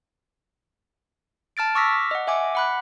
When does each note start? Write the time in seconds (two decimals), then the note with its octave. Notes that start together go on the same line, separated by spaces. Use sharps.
1.57 A5 F6 A6 D7
1.75 C#6 D6 E6 F6 A#6 B6
2.11 D#5 F#5
2.27 E5 G#5 D6
2.55 F#5 B5 F#6